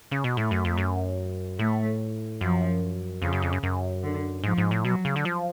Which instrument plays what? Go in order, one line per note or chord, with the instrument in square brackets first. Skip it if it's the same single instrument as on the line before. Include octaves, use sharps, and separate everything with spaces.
[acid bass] C#3
B2
[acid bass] A2 [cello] A3
[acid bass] F#2
F2
F#2
[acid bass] A2 [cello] A3
[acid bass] F#2 [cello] F3
[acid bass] F2 [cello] C#3
[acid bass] F#2
F2
F#2
F#2
[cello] D3
[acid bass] G#2 [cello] F3
[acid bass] G#2
A2
[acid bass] B2 [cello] F#3
[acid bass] C#3
D3
F3